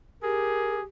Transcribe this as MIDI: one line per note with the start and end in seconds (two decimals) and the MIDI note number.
0.23 0.82 67
0.23 0.82 68
0.23 0.77 70